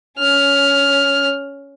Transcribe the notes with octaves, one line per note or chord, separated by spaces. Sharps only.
C#4 F6